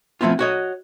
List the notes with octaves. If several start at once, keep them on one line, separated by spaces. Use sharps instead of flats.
F3 A3 B3 C4 E4 F4
F#4 C#5 D#5